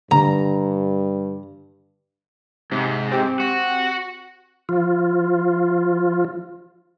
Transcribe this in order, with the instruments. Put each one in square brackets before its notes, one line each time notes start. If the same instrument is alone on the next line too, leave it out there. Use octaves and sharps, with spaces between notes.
[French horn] G2 [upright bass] D3 D#3 [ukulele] A#5
[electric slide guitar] G#2 [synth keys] C3
[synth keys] C4 G4
[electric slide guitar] F#4
[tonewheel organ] F3 F4